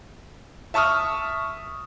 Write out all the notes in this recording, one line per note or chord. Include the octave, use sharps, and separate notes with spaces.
E5 A5 C#6 D#6 F6